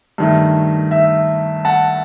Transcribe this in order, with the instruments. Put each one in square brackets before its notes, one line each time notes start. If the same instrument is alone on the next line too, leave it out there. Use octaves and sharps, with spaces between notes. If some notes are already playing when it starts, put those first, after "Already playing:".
[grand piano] G2 D#3 A3
E5
F#5 A5